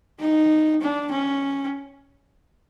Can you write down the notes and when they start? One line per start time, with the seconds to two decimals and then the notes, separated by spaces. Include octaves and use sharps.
0.20 D#4
0.82 D4
1.12 C#4